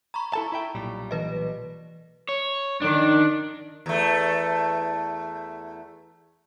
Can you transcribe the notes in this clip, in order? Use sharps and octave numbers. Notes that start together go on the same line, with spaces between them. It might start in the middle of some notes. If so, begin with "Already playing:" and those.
A#5 B5 C#6
E4 A4 A5
E4 E5 G5
B1 A#2 G3
E3 B4 D#5
C#5
D#3 D4
E2 A3